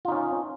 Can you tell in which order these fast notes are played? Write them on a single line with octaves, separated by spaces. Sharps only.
F4 D#4 C#4